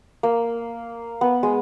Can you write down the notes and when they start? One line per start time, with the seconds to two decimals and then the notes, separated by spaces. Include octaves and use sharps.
0.23 A#3
1.21 B3
1.43 G#3